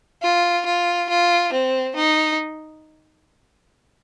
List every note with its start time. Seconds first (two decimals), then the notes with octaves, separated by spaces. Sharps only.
0.22 F4
0.66 F4
1.10 F4
1.52 C4
1.96 D#4